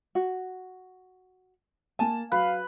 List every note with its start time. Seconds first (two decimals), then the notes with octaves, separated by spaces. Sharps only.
0.15 F#4
1.99 A#3 G#5 A5
2.32 F#3 B4 F5